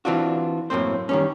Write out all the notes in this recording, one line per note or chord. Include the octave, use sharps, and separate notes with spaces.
E3 C4 D4 F4 F#4
F#2 A2 A#3 C4 C5
D#3 G3 C#4